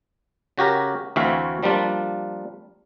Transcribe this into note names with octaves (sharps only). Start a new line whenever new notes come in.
C#3 F#4 G4 A#4
D2 E3 C4 F#4 E5 F5
F3 G3 A#3 D4 F4